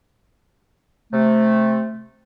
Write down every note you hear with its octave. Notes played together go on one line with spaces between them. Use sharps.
C3 A3